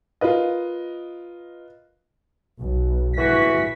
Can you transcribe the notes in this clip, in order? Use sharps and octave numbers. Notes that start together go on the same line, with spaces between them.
F4 A#4 B4 D#5
B1
E3 F#4 B6